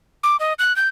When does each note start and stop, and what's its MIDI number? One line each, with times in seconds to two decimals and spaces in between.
0.23 0.37 86
0.40 0.53 75
0.59 0.75 90
0.76 0.88 91